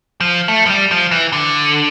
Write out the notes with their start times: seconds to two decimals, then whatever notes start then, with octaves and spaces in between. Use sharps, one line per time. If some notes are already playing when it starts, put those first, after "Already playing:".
0.20 F3
0.48 A3
0.66 F3
0.70 G3
0.91 F3
1.11 E3
1.32 D3